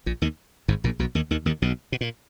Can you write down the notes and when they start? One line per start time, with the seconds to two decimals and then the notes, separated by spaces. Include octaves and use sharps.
0.06 A#1 A#2
0.22 D#2 D#3
0.68 G#1 G#2
0.84 A#1 A#2
0.99 B1 B2
1.15 D#2 D#3
1.31 D#2 D#3
1.46 D#2 D#3
1.62 B1 B2
1.92 B2
2.01 A#2